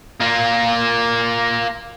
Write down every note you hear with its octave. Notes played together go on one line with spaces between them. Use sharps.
A#3 F4